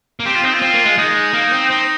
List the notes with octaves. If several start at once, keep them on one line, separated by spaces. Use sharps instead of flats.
A#3
C4 G4
F4
C4 D#4
F4
C4
A#3
G#3
G#3 D#4
A#3
C4
C4 D#4